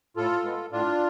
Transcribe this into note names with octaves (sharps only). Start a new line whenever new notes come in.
A2 F4 A4
G#3 B3
A2 D4 F4